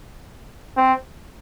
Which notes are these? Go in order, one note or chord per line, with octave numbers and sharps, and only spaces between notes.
C4